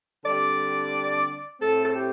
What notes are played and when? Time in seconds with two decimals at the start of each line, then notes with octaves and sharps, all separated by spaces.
0.24 D3 G3 C4 D5
1.59 A2 A3 C4 A4
1.85 A4
1.94 G4